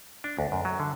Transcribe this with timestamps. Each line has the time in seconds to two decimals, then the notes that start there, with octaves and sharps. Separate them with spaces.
0.24 D4
0.39 D2
0.52 F#2
0.65 F#3
0.80 D3